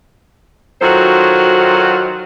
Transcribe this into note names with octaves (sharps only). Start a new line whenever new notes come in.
D#3 F#3 F4 F#4 A4 C5